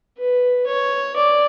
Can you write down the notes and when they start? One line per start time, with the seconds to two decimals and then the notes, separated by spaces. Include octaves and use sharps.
0.18 B4
0.66 C#5
1.16 D5